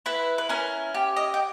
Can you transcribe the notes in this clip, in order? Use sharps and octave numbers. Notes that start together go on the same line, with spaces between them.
E4 B4
B4
C#4 A#4
G4
D#5
G5